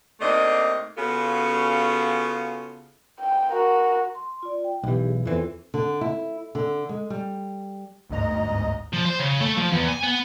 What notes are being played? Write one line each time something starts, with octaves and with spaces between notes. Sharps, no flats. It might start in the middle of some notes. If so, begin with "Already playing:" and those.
C3 A3 A#3 D4 D#4 D#5
C#3 B3 C#4 F4 F#4 A4
G5
F#4 A#4
C6
F4 D5
G5
B1 E3 D#4 G4
G#4
E2 E3 C4 F4 A4
D3
E4
D3
G#3
G3
G1 D2 G#2 D#5 A#5
F3
C5
C#3
A3
F3
E2
G#5
B3